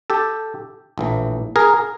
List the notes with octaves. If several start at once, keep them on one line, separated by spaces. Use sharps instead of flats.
G4 A4
A#1 A2 E3
G#4 A#4